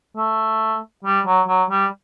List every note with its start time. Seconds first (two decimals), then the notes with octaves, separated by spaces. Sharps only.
0.16 A3
1.05 G3
1.27 F#3
1.48 F#3
1.71 G3